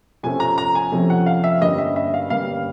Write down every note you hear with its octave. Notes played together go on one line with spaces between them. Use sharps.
F2 C3 F3 A3 C#4 G#5
A#5
A#5
G#5
F2 C3 F3 A3 C#4
F#5
F5
E5
G2 D3 G3 A#3 C#4 D#5
E5
E5
F5
G2 D3 G3 A#3 C#4 F5